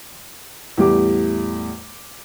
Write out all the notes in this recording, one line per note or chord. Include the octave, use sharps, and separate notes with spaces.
E2 A2 G3 G4 D6